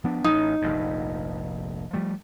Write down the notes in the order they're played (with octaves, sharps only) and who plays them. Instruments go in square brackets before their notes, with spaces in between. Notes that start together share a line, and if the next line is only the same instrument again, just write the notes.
[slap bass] F3 B3 D4
[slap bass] A1 [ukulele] D#4
[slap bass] F1 A#1 G#2
F3 G3 A3